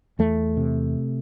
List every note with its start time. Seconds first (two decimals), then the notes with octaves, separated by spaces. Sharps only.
0.19 E2 A3
0.57 C3